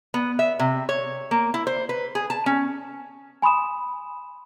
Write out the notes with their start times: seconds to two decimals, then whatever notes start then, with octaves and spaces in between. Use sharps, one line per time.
0.14 B3
0.39 E5
0.59 C3
0.89 C#5
1.31 A#3
1.54 E4
1.67 C5
1.89 B4
2.15 G#4
2.30 A5
2.46 C#4
3.42 G#5 B5 C6 D#6 E7